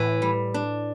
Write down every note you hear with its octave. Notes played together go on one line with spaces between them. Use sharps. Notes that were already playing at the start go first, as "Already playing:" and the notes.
Already playing: A2 E3
G3
D4